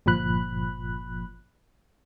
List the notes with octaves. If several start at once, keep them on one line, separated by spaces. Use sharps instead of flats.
G1 A#2 F3 B5 F#6